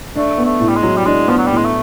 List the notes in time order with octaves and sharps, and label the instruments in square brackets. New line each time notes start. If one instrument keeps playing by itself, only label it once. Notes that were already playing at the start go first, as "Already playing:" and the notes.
[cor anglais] A3 [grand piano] D4
[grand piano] B3
[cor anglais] A3
[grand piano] A2
[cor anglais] G3
G#3
[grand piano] F#3
[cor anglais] G3
[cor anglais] G#3 [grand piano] D4
[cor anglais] F3 [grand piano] B3
[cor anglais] F#3
[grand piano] A2 [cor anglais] G3
[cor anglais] G#3
A3